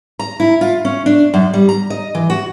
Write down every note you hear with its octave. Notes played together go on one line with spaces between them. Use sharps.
A#5
E4
F4
C#4
D4
F#2
G3
A#5
D#5
E3
F#4